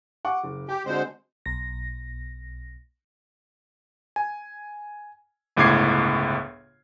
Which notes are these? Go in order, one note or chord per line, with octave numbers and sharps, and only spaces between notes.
F#5 C#6 D6
F#1
G4 G5
D3 G#3 C4 F#4 C5
B1 A#6
G#5
G1 C#2 A2 D6 G#6 C7